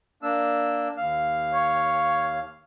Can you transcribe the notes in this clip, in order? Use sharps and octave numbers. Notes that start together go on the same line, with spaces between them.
A#3 D4 E6
D#2 F5
C#5